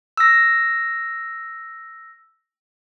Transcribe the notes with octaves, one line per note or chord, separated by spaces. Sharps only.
E6 A#6